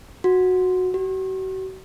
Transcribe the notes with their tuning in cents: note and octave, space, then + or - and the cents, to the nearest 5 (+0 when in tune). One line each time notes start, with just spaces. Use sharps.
F#4 -10
F#4 +40